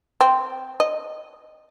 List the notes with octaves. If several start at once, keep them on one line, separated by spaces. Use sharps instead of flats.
C4
D#5